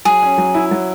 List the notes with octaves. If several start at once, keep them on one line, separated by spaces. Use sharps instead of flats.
F#3 G#4
C#4
F#3
E4
F#3